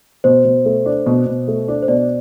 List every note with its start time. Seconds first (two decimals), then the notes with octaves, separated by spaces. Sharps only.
0.24 B2 C5
0.45 B2
0.65 A3
0.86 D4
1.06 B2
1.26 B2
1.48 A3
1.68 D4
1.83 C5
1.88 B2 D5